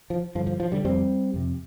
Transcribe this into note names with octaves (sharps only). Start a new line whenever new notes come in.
F3
G2 D3 F3
F3
F3
D3 G3
F2 C3 G3 C4
F2 C3